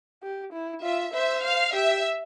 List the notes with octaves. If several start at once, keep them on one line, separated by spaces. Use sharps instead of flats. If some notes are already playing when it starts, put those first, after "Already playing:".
G4
E4
F4 E5
C5 E5
F5
G4 E5